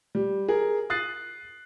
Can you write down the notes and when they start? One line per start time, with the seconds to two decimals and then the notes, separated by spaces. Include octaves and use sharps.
0.15 G3
0.48 G#4 A#4
0.90 D#6 F#6 A6 C7